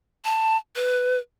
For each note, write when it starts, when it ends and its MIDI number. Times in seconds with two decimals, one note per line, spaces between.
0.25 0.57 81
0.75 1.18 71